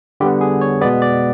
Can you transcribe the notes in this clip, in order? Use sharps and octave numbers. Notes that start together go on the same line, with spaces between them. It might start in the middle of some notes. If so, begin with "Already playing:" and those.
D3 G3 B3 G4
G#4
C#5
B2 G#3 B3 D5
D5